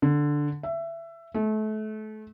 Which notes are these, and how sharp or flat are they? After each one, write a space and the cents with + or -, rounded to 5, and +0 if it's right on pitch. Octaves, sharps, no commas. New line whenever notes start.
D3 +0
E5 +20
A3 -30